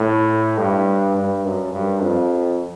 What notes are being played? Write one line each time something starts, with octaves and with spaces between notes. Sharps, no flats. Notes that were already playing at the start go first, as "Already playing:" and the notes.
Already playing: A2
G2
G2
F#2
G2
F2